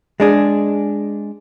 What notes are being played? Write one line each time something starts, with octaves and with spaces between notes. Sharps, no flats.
G#3 D4 G#4